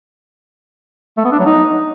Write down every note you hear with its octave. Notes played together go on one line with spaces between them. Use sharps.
A3
B3
D4
F#3
D#4